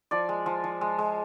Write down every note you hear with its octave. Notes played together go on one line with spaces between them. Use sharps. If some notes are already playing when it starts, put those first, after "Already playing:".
F3 D5
G#3
F3
F3
G#3
G#3